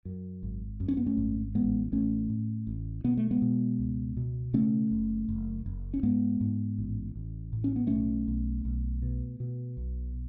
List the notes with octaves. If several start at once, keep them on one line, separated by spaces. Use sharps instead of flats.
F#2
G#1
F#2
C#4
B3
A3 C#4
G#1
A1 G#3 B3
A1 A3 C#4
A2
A1
B2 B3
A3
G#3 B3
B2
C#2
B2
C#3 A3 C#4
F#1
F#1
F#1
C#4
G#2 G#3 B3
G#2
A1
A1
A2
C#4
B3
B1 A3 C#4
B1
B1
B2
B2
B1